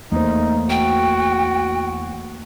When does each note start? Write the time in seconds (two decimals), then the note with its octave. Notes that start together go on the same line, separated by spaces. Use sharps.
0.12 E2 A3 A#3 D#4 C5
0.70 F#4 G5